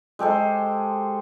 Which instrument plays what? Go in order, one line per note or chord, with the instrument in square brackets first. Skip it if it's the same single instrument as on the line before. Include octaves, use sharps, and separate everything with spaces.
[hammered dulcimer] G#3 G4 A4 C5